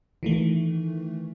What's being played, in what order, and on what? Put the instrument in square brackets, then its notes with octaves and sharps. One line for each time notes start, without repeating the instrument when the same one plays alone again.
[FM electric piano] D#3 E3 A3